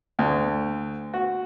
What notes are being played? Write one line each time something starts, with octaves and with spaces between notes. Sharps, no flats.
D2
F#4